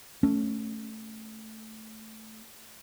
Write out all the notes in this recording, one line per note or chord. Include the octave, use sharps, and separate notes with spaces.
A3 C#4